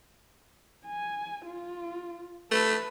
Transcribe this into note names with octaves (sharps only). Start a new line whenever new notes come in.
G#5
F4
A3 A4 B4